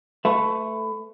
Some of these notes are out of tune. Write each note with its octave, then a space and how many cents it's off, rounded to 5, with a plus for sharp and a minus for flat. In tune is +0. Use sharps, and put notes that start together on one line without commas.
A3 +0 B4 +25 E5 +10